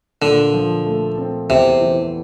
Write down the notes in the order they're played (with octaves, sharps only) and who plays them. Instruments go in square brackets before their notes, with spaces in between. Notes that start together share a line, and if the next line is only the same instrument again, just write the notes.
[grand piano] A#2 [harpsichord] D3
[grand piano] F3
A3
C4
[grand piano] E2 [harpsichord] C3
[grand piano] E3